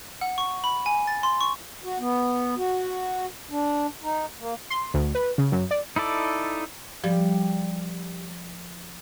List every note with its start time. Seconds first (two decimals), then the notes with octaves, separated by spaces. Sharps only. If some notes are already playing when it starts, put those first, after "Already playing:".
0.21 F#5
0.38 C#6
0.64 B5
0.86 G#5
1.07 A6
1.23 C6
1.41 C#6
1.84 F#4
2.00 B3
2.57 F#4
3.51 D4
4.03 D#4
4.40 A#3
4.70 C6
4.94 D2
5.15 B4
5.38 C#3
5.52 F#2
5.71 D5
5.96 D#4 E4 A4 D5
7.04 F3 G3